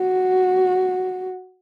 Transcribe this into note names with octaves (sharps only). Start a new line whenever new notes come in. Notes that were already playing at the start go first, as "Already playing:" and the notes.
Already playing: F#4